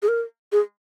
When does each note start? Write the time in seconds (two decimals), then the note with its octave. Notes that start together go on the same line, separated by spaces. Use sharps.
0.02 G#4
0.08 A#4
0.52 G#4